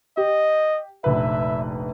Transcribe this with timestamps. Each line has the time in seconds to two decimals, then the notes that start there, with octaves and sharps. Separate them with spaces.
0.17 G4 D#5
1.04 F1 A#1 B4 E5